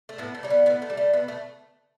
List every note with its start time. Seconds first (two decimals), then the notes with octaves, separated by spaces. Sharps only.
0.09 A3
0.18 A2 B3
0.34 A3
0.43 G3 C#4
0.50 B3
0.66 A2 B3
0.82 A3
0.90 G3
0.97 A3
1.13 B2 B3
1.28 A3